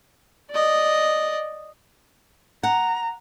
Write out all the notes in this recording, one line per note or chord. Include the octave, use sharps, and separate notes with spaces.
D5 D#5
F#5 A#5